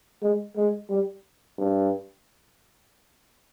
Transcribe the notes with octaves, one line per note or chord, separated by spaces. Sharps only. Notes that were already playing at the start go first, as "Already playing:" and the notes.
G#3
G#3
G3
G2